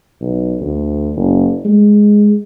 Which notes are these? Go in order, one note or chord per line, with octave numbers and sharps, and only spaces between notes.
B1
D2
F#1
G#3